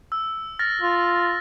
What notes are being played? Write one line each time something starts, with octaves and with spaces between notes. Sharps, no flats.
E6
F6 A6 A#6
F4